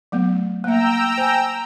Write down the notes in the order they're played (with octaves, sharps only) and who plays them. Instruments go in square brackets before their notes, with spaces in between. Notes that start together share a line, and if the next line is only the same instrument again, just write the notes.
[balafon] F#3 A3 B3
[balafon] A#3 E5 [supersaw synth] G5 A#5 E6
[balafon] C5 G#5